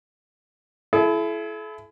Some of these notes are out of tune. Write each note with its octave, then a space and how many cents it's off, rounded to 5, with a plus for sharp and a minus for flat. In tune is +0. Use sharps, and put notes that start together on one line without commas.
E4 +25 A4 -40